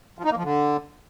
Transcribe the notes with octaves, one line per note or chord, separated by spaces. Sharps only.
F3
D#4
A#3
F3
D3